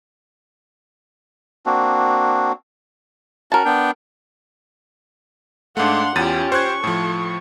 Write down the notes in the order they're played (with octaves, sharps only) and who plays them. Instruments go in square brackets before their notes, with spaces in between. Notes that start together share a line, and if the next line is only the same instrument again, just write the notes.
[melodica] A#3 C4 D4 F#4
[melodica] C#4 F#4 [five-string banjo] A#4 A5
[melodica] B3 D4 G5
[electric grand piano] G#2 A3 [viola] D4 F#5 [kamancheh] F5 C6
[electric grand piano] E2 A6 D#7 [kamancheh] C#4 G4 [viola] F4
[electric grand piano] C5 F#6 G#6 [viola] C#6
[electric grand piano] A2 F3 [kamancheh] A4